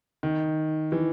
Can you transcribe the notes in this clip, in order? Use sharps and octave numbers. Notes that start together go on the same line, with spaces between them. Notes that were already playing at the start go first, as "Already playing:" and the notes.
D#3
E3